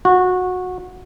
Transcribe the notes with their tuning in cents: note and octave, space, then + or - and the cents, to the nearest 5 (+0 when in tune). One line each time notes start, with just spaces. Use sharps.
F#4 -20